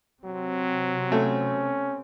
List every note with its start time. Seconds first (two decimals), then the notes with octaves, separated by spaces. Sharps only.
0.24 C3 F#3 C4
1.12 A3 C#4